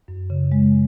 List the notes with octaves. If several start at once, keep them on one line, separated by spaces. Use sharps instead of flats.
F#2
C#3
G#3